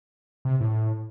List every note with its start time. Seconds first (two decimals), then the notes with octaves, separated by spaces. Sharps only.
0.45 C3
0.61 A2